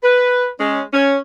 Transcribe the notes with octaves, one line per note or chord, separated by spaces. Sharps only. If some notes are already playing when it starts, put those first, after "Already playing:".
B4
G#3 C#4
C#4